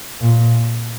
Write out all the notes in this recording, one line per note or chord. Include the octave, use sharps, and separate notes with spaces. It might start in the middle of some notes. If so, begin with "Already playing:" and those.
A#2